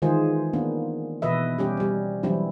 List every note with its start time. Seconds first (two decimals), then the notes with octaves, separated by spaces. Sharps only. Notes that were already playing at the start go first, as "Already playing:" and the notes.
0.02 D#3 E3 G#3 F4 G#4 C5
0.53 A#3 B3 D4
1.22 B2 E3 B4 D#5 E5
1.58 G3 C#4 G4
1.77 G3 C4
2.23 E3 F#3 G3 C4 D4 E4